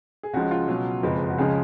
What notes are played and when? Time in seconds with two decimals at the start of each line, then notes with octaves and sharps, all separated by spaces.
0.23 G#4
0.33 C#2 C#3 F3 G#3 F#4
0.51 F4
0.68 C#2 B2 F#3
1.03 F#1 F2 F3 G#3 B4
1.30 F#4
1.38 C#2 C#3 F3 G#3 G#4